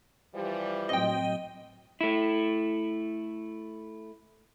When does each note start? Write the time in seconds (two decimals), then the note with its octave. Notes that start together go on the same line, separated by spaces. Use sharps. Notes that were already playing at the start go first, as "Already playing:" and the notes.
0.35 E3 F3 G3
0.89 A2 F#3 C4 D#5 G5
2.01 A3 E4